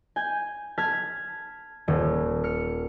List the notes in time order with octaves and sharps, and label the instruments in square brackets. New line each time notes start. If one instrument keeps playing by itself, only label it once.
[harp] G#5 G6
A5 F6 G#6 B6
D#1
F6 C#7